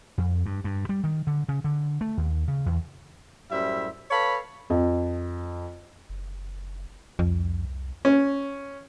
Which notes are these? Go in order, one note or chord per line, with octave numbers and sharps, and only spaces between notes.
F2
G2
G2
G3
D#3
D3
C#3
D3
A3
D#2
C#3
E2
F#2 A2 G3 E4 C5 E5
A4 B4 C#5 F5 A5 B5
F2
F#1
C2 F2
C#4